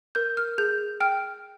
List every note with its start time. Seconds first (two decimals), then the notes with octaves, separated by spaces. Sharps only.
0.15 A#4 G6
0.37 F6
0.58 G#4 G6
1.00 G5 F6